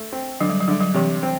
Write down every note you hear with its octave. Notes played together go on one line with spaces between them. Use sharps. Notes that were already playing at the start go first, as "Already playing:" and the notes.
Already playing: A3
C4
D3 F#3
G3
F#3
D3 G3
F#3
C3 E3
C4